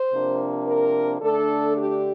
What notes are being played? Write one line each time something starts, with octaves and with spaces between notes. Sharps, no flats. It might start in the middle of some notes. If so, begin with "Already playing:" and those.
Already playing: C5
C3 F3 A#3 D4
A#4
D3 A3 D4 A4
G4